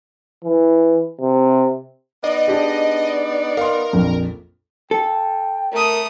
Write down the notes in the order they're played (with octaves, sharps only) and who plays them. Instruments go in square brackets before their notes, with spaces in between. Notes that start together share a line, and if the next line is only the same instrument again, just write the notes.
[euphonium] E3
C3
[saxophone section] B3 D#4 D5 [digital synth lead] D#5
[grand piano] D4 G4 G#4
[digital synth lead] A#4 [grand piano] F5 C6
[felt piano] A#1 F2
[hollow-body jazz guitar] A4 [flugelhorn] G5
[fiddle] A3 D#6 [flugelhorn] A#4